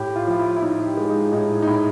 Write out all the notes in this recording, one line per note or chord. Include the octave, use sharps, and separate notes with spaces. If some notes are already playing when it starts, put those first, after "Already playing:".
Already playing: A2 G4
F4
F3 F4
E4
E4
A2 D#4
G4
G#3
D#4
A2 D#4
D#4
A2 E4